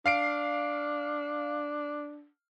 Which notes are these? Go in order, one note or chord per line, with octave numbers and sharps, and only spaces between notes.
D4 F5 C7 D7